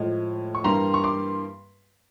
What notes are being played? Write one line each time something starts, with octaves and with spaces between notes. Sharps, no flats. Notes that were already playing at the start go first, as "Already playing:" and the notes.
Already playing: A2 F3 G#3
C#6
G2 E3 G3 A#3 A#5 C6
C#6
C6 D6